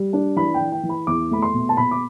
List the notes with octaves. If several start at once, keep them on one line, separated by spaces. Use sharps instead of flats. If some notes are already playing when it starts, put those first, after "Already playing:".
Already playing: G3
D4
E3 B5
G5
E3
G5
E3
B5
E2 D6
A3 B5
C6
B2
A5
B2 B5
D6